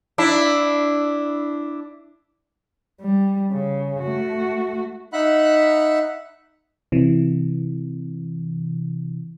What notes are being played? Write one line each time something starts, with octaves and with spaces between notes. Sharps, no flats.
D4 E4
G3
C#3
A3 F#4
D#4 E5 F#5 B5 F#6
C3 E3